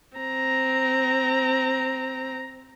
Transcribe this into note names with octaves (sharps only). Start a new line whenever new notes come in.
C4 A#5